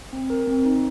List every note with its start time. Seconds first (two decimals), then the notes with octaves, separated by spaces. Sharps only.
0.13 C4
0.30 A#4
0.47 C4
0.65 D#4